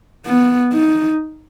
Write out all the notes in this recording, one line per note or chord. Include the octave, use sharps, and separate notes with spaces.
B3
D#4